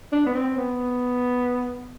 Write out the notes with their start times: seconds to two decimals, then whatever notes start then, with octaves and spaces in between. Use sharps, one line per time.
0.12 D4
0.26 B3
0.34 C4
0.57 B3